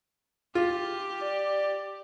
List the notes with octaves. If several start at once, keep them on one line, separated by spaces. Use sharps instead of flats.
F4 G4
D5